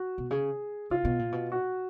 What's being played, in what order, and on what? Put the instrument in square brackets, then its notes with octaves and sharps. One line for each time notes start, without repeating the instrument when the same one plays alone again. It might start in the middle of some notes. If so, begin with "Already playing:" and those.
Already playing: [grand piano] F#4
[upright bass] B2
[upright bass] C#3 [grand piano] G#4
[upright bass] C#3 [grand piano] F4
[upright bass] B2
A#2
B2
[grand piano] F#4